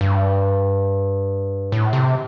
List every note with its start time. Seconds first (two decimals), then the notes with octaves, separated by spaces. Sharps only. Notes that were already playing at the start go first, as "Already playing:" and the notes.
0.01 G2
1.72 A2
1.93 C3